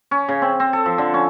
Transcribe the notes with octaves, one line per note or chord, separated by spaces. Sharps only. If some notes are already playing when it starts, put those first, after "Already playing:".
C#4
C#3
C4
C4
A4
F3
D3
C#4